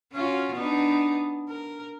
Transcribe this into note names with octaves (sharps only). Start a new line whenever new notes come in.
C#4 F4 F#4
B3 D4 D#4
A#4